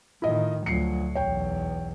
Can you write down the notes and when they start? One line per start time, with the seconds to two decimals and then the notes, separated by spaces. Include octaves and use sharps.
0.22 A2 D#3 E4 F4 D#5
0.66 D2 F3 F#3 C7 C#7
1.15 B1 E2 C#5 G5